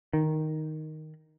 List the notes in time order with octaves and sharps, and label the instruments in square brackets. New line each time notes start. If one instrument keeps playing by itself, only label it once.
[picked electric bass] D#3